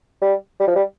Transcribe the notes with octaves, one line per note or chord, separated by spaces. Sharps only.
G3
G3
F3
G3